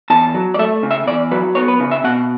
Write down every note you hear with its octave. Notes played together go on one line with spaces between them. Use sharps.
E2 A5
F#3
D5
A3 E5
C#3
E5
E2 D5
F#3 B4
B3 C#5
B4
C#3
E5
B2 F#5